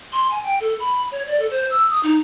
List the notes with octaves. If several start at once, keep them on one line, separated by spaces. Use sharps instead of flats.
C6
G#5
G5
A4
B5
C#5
D5
A4
C5
E6
D#6
D#4